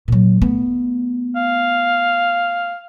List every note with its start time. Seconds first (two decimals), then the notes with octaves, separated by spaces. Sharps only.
0.08 A#2 F#3
0.41 A3 B3
1.36 F5